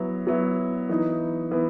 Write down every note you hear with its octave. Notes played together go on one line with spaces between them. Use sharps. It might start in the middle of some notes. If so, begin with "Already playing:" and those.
Already playing: F#3 B3 E4
F#3 B3 E4
E3 B3 D#4
E3 B3